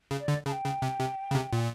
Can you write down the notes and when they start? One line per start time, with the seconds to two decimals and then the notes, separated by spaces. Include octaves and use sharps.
0.11 C#3
0.20 D5
0.28 D3
0.46 C#3 A5
0.52 G5
0.65 C#3
0.82 C3
1.00 C3
1.31 C#3
1.35 C3
1.53 A#2